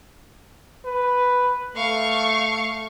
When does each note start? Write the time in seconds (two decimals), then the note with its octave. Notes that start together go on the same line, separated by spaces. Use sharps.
0.85 B4
1.76 A3 F5 C#6